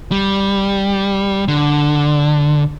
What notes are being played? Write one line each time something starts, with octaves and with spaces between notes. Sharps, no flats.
G3
D3